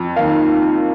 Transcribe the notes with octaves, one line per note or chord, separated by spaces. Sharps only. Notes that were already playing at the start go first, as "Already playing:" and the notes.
Already playing: F2
D#3 A#3 F5